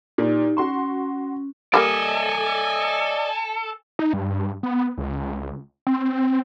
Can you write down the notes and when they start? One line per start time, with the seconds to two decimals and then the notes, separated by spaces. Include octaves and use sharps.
0.18 A#2 D#4 G4 D5
0.57 C#4 F#4 C6 C#6
1.74 G3 G#3 A#3 A4 D5 D#5 G#5
3.99 D#4
4.13 G2
4.63 B3
4.98 C#2
5.87 C4